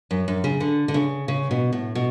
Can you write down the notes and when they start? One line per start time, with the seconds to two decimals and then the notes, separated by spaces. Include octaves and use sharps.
0.11 F#2
0.28 F#2
0.44 C#3
0.60 D3
0.88 D3
0.94 C#3
1.28 C#3
1.51 B2
1.73 A2
1.95 B2